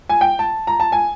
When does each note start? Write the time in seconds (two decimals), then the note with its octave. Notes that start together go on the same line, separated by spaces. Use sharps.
0.09 G#5
0.21 G5
0.39 A5
0.67 A#5
0.80 A5
0.92 G#5